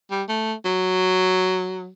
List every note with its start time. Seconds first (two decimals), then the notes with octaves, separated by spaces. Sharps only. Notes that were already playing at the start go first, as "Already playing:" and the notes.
0.11 G3
0.29 A3
0.65 F#3